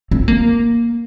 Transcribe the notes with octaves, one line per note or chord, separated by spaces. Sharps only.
C4
A#3